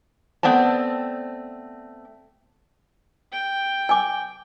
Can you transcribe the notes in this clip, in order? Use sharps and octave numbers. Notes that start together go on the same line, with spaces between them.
A3 B3 C4 D5 A5
G5
G#5 D6